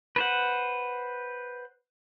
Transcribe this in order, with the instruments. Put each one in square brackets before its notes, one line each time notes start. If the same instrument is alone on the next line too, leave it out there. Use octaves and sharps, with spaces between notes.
[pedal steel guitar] B4 C5 F#5